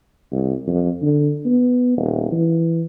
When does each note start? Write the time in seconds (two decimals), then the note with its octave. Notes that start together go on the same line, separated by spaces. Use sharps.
0.32 C2
0.67 F2
1.02 D3
1.45 B3
1.97 D#1
2.32 E3